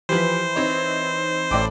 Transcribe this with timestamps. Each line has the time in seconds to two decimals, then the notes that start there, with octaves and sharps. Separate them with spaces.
0.09 E3 F3 G4 B4 C5
0.56 C4 D#4 C#5
1.51 A1 A2 D5 G5 D6